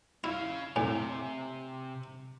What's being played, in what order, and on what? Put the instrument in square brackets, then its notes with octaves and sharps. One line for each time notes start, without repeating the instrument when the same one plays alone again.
[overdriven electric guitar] C#4 F5 [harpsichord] E4
[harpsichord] A2 [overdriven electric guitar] C3 [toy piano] G#5